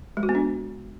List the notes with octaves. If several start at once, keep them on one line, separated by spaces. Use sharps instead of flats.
G#3
F#4
B3
D4